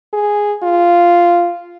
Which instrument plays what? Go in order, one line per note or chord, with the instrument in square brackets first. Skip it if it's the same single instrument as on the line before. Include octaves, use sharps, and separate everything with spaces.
[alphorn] G#4
F4